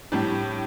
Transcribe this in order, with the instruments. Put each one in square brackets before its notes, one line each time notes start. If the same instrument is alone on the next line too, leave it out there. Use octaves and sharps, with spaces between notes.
[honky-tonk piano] A2 G3 D4 G4